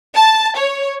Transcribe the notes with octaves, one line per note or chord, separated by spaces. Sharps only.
A5
C#5